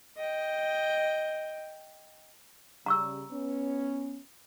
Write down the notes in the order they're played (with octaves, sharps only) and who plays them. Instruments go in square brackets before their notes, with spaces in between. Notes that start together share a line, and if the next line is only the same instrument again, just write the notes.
[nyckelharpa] D#5 G5
[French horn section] C#3 G3 [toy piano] A#5 C#6 E6
[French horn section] B3 C#4